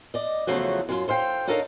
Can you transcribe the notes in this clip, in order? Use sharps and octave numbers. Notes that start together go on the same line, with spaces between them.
D5 D#5
E2 C#3 F3 F#3 A3 F#4
F#2 F#3 F4
A4 C5 F5 G5
D4 D#4 A4 A#4 C#5 F5